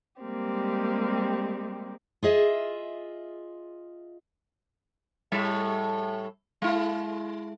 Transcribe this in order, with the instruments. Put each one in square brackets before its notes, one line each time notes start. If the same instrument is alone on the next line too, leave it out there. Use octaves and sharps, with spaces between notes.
[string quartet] G3 G#3 A#3 C4 G4
[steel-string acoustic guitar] F4 G#4 D#5 E5
[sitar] A2 G3 E5
G#3 E4